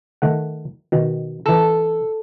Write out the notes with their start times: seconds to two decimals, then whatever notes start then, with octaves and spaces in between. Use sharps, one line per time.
0.22 D#3 A3 F#5
0.92 B2 D#3
1.46 E3 A4 A#5